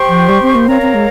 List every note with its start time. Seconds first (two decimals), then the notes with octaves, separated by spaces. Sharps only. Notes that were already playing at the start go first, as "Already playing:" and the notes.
Already playing: G4 C5 G5 C#6
0.08 F3
0.29 G3
0.42 C4
0.55 A#3
0.68 C4 A#4 C#5 F5 A#5
0.82 C4
0.94 G#3